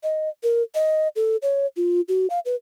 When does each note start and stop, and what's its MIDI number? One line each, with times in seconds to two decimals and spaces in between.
0.03 0.29 75
0.43 0.63 70
0.75 1.08 75
1.16 1.37 69
1.42 1.66 73
1.77 2.01 65
2.08 2.27 66
2.30 2.39 77
2.46 2.55 71